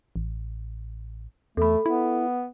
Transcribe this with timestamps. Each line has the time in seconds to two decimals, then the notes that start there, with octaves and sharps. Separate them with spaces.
0.16 A1
1.57 E2 A3 A4 B5
1.86 B3 E4